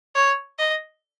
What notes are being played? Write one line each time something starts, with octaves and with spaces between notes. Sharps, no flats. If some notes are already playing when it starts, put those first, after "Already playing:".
C#5
D#5